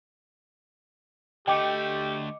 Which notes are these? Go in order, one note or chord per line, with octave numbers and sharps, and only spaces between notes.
D3 A3 G4 D#5 G5 D6 C#7